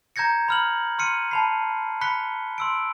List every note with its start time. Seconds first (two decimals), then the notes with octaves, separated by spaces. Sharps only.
0.16 A#5 G6 G#6 A#6 C#7
0.48 B5 F6 F#7
0.98 C6 F6 C#7 D#7
1.31 A5 B5 C7
2.01 B5 F#6 B6 C#7 G7
2.58 C6 E6 D7